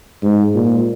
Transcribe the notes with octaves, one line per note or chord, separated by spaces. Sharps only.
G#2
A#2